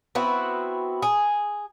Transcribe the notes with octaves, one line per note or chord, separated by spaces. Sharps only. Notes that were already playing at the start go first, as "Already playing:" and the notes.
B3 C4 E4 F#4
G#4